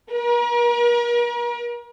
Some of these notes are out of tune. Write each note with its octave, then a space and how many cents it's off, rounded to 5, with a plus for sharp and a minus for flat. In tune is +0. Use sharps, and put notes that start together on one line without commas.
A#4 +40